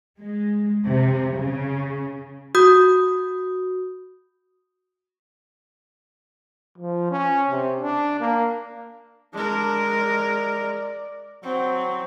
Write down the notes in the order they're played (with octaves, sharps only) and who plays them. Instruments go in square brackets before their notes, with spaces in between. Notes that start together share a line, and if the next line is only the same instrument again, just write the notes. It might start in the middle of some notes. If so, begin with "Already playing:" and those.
[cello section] G#3
C3
C#3
[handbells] F#4 D#6 G6
[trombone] F3
C#4
C3
D4
A#3
[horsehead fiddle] G#3 A#4 [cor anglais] D4
[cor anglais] D5
[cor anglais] F#3 [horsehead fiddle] C4